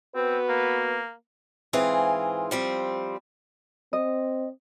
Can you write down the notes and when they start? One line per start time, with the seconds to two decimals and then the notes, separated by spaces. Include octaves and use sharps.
0.15 B3 C4 F#4 B4
0.49 A#3
1.73 G#2 E3 C4 F4 G#4
2.51 F3 G3 C4
3.93 C4 D#5